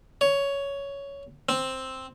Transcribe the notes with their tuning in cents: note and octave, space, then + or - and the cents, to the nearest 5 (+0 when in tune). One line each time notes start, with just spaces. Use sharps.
C#5 +10
C4 +5